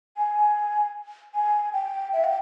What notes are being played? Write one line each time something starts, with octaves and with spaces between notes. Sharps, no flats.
G#5
G#5
G5
E5
G5